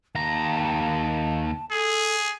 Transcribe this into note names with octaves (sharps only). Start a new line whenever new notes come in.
D#2 A5 A#5
G#4 A4